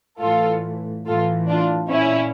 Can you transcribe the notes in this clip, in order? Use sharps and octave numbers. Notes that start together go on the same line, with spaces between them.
A2 E3 F4 A4
A2 E3 F4 A4
D4 F4
A#2 C#4 E4